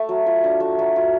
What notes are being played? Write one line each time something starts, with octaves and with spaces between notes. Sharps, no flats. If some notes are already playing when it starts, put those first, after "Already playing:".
Already playing: A3
F#3
F4
D4
A3
F#3
F4